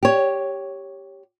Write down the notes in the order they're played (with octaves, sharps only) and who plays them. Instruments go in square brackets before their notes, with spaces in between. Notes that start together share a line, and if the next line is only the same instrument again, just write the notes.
[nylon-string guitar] G4 C#5